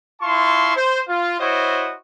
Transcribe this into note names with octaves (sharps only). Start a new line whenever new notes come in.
E4 F4 A5 C6 C#6
C5
F4
E4 F#4 C5 C#5 D#5